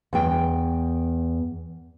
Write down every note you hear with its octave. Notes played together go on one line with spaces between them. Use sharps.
E2 G5